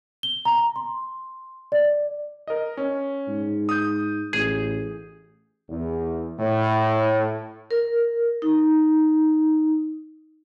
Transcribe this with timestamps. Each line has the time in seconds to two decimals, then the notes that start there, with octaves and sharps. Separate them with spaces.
0.23 G7
0.45 A#5
0.76 C6
1.72 D5
2.47 A#4 D#5
2.77 C#4
3.28 G#2
3.69 D#6 G6
4.33 A1 G#4
5.68 E2
6.39 A2
7.71 A#4
8.42 D#4